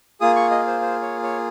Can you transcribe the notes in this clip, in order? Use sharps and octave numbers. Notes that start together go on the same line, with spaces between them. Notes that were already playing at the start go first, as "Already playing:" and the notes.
A#3 F4 G#4 D#6
C#6
D#5
C5
C5
C#5
C#5